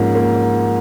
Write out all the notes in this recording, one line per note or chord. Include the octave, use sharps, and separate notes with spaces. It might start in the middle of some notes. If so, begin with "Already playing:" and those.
Already playing: G#2 F3 A#3 C#4
A#3